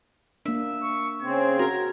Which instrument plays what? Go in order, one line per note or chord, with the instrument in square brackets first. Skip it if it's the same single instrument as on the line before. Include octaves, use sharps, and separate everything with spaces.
[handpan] A#3 D4 [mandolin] E5
[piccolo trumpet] C#6
[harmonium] C#3 C4 [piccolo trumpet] G#6
[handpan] F#4 [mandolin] A#4